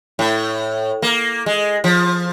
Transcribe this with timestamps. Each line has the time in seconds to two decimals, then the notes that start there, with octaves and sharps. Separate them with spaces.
0.19 A2
1.02 A#3
1.46 G#3
1.84 F3